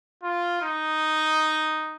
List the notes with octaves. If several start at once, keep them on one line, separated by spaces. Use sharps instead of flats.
F4
D#4